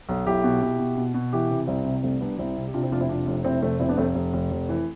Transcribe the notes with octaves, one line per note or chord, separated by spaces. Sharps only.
B1
B1 E4 G4
B2
B2
B2
B2
B2
E3 E4 G4
C3
C2 C4 E4
C3
C2 A3 C4
C2 B3 D4
C2 C4 E4
C3
G4
C3 D4 F4
C4 E4
F1 D4 F4
C4 E4
C3 D4 F4
F1
C3 C4 E4
F1 A3 C4
F1 C4 E4
B3 D4
F1 A3 C4
F1
F1
F1
E3